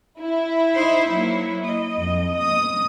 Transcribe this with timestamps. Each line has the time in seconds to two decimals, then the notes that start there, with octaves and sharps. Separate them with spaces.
0.20 E4
0.75 D#4 C5
1.09 F#3 A#3
1.65 D#5
1.99 F2
2.36 D#6